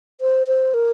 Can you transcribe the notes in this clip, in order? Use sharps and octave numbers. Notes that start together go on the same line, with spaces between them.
C5
C5
A#4